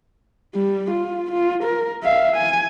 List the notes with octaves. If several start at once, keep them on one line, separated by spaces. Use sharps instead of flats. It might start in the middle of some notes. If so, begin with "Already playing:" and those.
G3
F4
F4
A#4
E5 F5
G#5